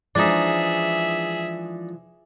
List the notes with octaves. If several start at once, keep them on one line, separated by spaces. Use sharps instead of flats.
E3 F3 G#3 D4 D#4 G#4 E5